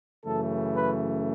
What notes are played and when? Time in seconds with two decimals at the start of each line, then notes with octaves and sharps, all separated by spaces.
0.24 F#2 C#3 E3 A3 A4
0.75 B4